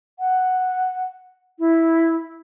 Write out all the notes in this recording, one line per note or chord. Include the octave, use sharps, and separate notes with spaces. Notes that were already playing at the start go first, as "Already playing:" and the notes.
F#5
E4